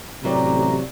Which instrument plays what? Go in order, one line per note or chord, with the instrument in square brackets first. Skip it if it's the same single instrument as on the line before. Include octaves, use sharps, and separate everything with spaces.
[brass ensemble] A1 A#5 [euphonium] C3 [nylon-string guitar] E3 F#3 D5 [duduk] G4